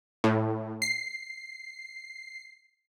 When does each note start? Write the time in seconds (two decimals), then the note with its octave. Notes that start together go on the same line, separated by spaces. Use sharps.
0.24 A2
0.82 C7